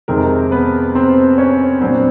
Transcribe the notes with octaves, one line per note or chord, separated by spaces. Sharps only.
F2 C3 D#3 G#3 C4 A#4
B3 B4
C4 C5
C#4 C#5
A#2 F#3 B3 C4 D4 C5